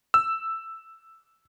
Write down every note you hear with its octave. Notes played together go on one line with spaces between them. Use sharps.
E6